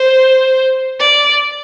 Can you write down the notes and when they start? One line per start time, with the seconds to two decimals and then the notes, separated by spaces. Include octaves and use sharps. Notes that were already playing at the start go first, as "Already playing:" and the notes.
Already playing: C5
1.00 D5